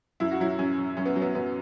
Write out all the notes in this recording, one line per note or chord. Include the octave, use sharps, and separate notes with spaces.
F#2 E4
F#4
F#3 E4
F#2 C#4
F#3
F#2 C#4
B3
F#3
B3
F#2 B3